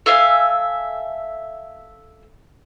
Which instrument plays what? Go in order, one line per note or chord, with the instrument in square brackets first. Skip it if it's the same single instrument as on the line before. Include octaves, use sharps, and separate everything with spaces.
[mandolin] A4 E5 F5 G#5